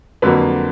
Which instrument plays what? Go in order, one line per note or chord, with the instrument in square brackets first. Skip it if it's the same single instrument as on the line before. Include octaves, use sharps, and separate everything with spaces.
[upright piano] F2 D3 F#3 A#3 B4